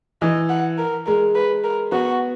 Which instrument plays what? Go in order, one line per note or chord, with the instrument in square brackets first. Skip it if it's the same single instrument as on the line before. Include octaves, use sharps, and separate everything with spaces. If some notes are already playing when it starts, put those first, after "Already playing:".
[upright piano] E3 [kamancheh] D#5
[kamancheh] F#5
A#4
[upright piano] G#3 [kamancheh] A#4
[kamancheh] B4
A#4
[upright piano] B3 [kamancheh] F#4